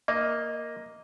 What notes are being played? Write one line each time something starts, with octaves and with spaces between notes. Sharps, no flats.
A#3 D#5